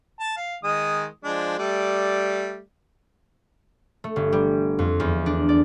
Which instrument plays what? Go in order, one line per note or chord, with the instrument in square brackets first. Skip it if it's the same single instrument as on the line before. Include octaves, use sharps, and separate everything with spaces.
[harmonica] A5
F5
D#3 G#3 D#6
F3 G#3 D4
G3 A3 D5
[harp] A3
G1
G3
F2
E2
D4
D5